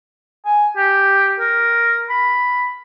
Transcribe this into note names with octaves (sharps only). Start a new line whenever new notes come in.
G#5
G4
A#4
B5